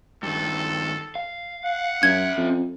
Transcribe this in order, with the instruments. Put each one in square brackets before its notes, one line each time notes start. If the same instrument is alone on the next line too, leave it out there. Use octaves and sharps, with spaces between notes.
[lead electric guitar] G2 D#3 [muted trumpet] A4
[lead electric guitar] F5
[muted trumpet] F#5
[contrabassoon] F#2 [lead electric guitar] C#4 E5 [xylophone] G#6
[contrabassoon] F2